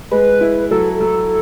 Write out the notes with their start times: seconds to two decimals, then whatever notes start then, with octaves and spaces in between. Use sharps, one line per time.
0.11 G#3 B4
0.41 E4
0.71 F#3 A4
1.00 F#3